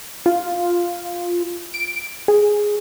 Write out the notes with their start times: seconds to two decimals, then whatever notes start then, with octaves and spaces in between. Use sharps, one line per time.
0.26 F4
1.74 D7
2.28 G#4